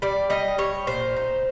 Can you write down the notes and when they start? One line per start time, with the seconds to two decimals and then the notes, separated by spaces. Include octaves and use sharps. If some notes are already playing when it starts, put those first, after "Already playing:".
0.02 G3 D5
0.30 G3 D#5
0.58 G3 C#5
0.87 A#2 C5
1.16 D#4